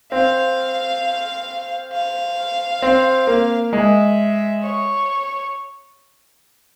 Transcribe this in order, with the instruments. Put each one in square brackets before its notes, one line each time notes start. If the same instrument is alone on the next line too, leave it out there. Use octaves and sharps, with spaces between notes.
[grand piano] C4 [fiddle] F5
[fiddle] F5
[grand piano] C4
A#3
[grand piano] G#3 [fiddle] E5
[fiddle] C#5